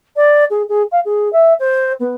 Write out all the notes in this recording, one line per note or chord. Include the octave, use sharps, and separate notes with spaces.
D5
G#4
G#4
F5
G#4
E5
C5
B3